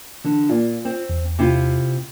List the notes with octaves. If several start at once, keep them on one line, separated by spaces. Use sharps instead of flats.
D3 E3
A#2 F4
C4
E2
C3 E4 F4